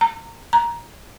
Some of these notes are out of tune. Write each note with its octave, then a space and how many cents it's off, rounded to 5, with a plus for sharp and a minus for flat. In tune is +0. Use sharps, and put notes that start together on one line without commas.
A#5 -25
A#5 +10